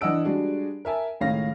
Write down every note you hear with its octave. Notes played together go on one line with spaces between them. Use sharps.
E3 D4 D#5 F#5 E6 D7
G3 G#3 D4 F#4 G#4
A#4 E5 G#5 A5
C#2 A2 D#3 C#4 F5 A#6